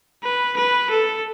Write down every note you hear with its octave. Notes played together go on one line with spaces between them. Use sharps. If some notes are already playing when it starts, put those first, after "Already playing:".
B4
B4
A4